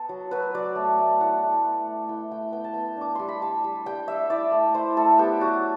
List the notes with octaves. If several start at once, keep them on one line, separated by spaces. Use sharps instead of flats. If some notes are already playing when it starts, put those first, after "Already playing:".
Already playing: B3 A4
F#3
F#3 B4
F#3 D5
A3
A3
E4 F#5
A3
A3
A3
E4 G5
A3 G5
B3 G5
A5
B3 G5
D4 D6
G3 C6
B5
G3 A5
G3
G3 G5
G3 E5
E4 D5
A3
E4 C5
A3 A4
B3 G4
F#3 F#4